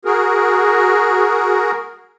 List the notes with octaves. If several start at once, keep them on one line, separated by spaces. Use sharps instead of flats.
F#4 G#4 A#4